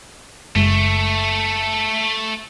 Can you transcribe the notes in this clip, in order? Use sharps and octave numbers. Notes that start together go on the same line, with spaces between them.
F#1 G#3 A3